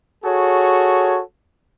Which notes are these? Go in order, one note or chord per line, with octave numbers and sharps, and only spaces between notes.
F#4 G#4 A4 C#5